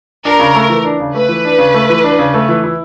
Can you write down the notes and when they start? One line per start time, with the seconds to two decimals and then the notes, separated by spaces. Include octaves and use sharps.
0.24 D4 A#4
0.39 C#3
0.55 A3
0.69 E3
0.85 D4
1.00 C#3
1.14 A3 B4
1.29 E3
1.45 D4
1.59 C#3
1.74 A3
1.90 E3
2.04 D4
2.19 C#3
2.34 A3
2.49 E3
2.64 E4